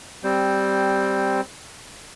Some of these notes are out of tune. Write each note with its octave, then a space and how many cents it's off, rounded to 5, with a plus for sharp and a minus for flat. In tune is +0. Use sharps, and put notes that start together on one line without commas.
G3 +0 C4 +0 C5 +0